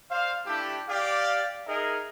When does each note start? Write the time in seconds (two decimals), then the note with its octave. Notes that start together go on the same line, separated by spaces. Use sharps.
0.11 C5 D5 F5
0.46 A3 D4 E4 G4
0.88 G4 D5 F5
1.66 D#4 G#4 A#4 D#5 E5